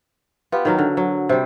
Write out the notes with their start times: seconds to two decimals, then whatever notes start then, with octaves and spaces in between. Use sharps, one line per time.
0.52 B3 F4 G4
0.65 D#3 F#3 A#4
0.78 D3
0.97 F#3
1.29 C3 G3